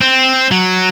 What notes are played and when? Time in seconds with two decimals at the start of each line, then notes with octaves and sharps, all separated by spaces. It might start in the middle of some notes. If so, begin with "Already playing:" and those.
0.01 C4
0.51 F#3